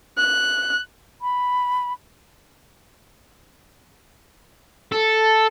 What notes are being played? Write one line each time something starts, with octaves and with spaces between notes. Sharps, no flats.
F#6
B5
A4